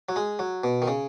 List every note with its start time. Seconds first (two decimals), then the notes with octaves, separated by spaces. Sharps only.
0.09 F#3
0.16 G#3
0.39 F#3
0.64 B2
0.82 D#3
0.88 C#3